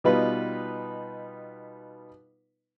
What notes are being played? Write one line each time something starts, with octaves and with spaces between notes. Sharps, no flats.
B2 G3 B3 D#4 F4 B4